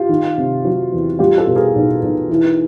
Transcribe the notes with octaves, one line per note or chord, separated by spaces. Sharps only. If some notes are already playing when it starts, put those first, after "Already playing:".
Already playing: F4 G4
D#3
C3
F#3
E2
G3 F4 G4
G4 A4
B2
G#4 A#4
B1
B1
E3